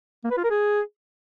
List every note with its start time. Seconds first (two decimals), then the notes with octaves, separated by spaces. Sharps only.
0.24 A#3
0.31 B4
0.37 F4
0.44 A#4
0.50 G#4